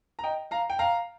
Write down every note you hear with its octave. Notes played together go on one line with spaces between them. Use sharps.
A#5
D#5 G5
F5 A#5
G5
F5 A#5